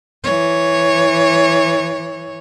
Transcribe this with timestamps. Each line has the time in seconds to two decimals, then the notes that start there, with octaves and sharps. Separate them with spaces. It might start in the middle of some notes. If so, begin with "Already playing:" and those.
0.24 E3 C#5